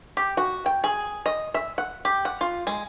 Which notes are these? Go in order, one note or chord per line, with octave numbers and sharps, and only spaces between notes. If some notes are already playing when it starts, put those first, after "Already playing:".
G4
F#4
G5
G#4
D#5
E5
F#5
G4
F#5
F4
G#3